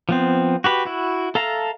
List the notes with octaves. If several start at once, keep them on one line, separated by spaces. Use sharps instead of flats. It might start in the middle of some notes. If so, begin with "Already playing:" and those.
F3 B3 C4
F#4 G4 B4
E4 F#4
A4 E5 F5 A5 A#5